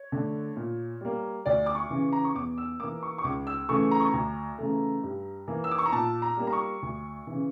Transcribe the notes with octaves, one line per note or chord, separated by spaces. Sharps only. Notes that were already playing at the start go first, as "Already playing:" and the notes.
Already playing: C#5
D3 A3
A#2
G3 A#3
D2 D5
D6
C#6
C#3 E3
A#5
C#6
E2 D6
E6
E3 A#3 D6
C#6
C#6
C#2 D6
E6
C#3 E3 A3 C#6
A#5
C#6
A#5
D2
C#3 E3 A3
G2
E3 A#3
E6
D6
C#6
A#5
A#2 A5
A#5
G3 A#3
A#5
C#6
D2
C#3 E3